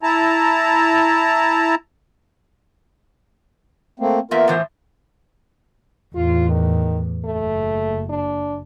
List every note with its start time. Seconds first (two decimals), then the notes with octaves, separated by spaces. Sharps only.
0.03 E4 A5 A#5
4.00 A3 A#3 C4
4.31 E2 A#3 B3 F4 A#4 E5
4.48 A2 E3 C5
6.15 E2 A2 F4
6.49 D#3
7.25 F#1 A3
8.10 D4